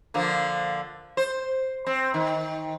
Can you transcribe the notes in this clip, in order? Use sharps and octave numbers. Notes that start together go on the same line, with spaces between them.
D3 F3 A#3
C5
C4
D#3